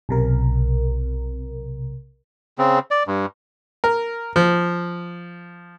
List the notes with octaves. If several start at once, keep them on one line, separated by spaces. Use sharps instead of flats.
B1 C3 A#4
C#3 C4
D5
G2
A#4
F3